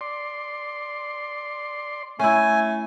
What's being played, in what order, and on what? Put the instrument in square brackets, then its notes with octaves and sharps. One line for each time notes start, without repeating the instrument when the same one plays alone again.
[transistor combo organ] D5 C6
[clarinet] A3 [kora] C#4 E4 [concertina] G#5